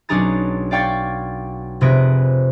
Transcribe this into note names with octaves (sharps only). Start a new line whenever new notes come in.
B1 C#4 D4 G#4 A#5 A6
D5 F5 G5 C#6 G#6 A6
F1 C3 G#4 B4 A#6 D7